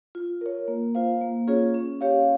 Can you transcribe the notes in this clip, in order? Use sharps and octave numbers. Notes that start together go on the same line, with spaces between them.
F4
A#4 C#5
A#3
F4 C5 F5
A#3
C#4 F4 G#4 C#5
C#4
G4 C#5 F5